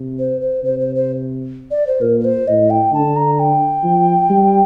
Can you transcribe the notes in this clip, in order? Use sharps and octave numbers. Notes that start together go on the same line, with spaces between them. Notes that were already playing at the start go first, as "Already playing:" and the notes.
Already playing: C3
C5
C5
C3 C5
C5
C5
D5
C5
A#2 A#4
A#4
C5
A2 D#5
G5
D3 A5
A#5
G5
F3
G3